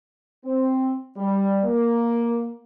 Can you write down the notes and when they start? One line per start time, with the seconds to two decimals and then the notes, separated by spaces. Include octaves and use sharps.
0.45 C4
1.16 G3
1.63 A#3